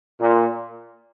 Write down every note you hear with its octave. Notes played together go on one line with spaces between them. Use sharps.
A#2